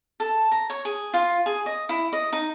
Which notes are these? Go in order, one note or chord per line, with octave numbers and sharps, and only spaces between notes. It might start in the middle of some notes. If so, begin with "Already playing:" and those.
A4
A#5
C#5
G#4
F4
G#4
D#5
E4
D#5
D#4